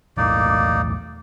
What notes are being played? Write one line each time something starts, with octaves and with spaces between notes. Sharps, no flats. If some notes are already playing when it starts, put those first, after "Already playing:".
B1 E2 A2 A#3 D#4 D5